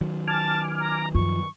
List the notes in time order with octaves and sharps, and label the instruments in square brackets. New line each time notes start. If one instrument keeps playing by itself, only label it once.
[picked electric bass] D#3 F#3
[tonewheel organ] G#5 D6 F6 [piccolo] A5
[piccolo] A#5
[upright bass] F#2 [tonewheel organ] F3 [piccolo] C#6